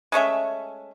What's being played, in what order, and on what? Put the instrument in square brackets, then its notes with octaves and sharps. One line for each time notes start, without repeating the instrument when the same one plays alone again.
[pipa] G#3 A3 C#4 E5